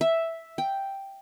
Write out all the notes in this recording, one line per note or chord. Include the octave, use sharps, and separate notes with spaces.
E5
G5